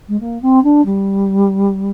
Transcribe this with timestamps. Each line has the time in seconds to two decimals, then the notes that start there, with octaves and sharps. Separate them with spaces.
0.08 G#3
0.20 A#3
0.42 C4
0.64 D4
0.85 G3